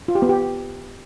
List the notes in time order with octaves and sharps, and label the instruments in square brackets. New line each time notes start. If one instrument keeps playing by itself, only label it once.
[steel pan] F4
G4
B3
G4